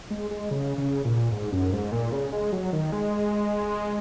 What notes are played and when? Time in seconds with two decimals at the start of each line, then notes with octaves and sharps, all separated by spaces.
0.11 G#3
0.31 G#3
0.51 C#3
0.78 C#3
1.05 A#2
1.32 G#2
1.52 F#2
1.72 G#2
1.92 A#2
2.12 C#3
2.32 G#3
2.52 F#3
2.73 D#3
2.92 G#3